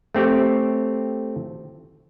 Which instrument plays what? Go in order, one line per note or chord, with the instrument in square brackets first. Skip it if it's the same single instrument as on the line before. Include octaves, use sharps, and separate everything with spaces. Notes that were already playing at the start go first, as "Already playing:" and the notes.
[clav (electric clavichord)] A3 C4 G4 C#5